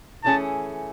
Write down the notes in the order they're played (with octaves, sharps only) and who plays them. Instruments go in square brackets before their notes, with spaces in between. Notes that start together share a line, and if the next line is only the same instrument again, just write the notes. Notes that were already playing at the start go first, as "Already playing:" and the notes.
[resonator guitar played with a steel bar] E3 A3 C#4 G#4 [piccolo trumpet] A5